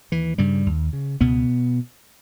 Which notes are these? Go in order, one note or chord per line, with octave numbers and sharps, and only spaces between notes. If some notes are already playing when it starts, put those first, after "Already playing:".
D#2 E3
G2 C#3 G3
D#2
C#3
C#2 B2 B3